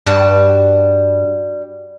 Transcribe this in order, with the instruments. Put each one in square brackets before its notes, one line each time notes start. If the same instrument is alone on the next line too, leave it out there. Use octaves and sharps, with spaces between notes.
[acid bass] G2 [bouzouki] G3 F#4 A5